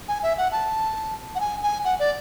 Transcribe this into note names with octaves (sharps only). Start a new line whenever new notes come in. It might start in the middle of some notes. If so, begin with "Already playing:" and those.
G#5
E5
F#5
A5
F#5
G#5
G#5
F#5
D5